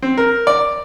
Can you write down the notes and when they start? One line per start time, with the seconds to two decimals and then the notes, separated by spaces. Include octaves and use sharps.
0.02 C4
0.18 A#4
0.47 D5